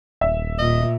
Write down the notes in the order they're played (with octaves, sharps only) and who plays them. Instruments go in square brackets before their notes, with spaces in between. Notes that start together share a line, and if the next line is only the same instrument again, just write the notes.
[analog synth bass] D#1 [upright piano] E5
[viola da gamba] A#2 [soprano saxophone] D#5